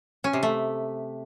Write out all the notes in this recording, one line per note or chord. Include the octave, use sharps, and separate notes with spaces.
C#4
C3
A3